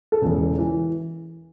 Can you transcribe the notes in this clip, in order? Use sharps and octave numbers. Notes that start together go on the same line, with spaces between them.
A4
E1 E2 C#3
E3